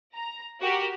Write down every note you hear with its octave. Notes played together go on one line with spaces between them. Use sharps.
A#5
F#4 G4 A#4